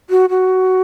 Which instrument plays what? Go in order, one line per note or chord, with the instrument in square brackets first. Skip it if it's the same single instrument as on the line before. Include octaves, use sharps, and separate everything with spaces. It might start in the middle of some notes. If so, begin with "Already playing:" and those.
[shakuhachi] F#4
F#4